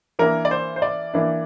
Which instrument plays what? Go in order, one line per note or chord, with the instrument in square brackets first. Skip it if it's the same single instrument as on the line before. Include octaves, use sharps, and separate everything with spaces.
[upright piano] E3 A#3 D4 A#4
D5
C5
C5
D5
E3 A#3 D4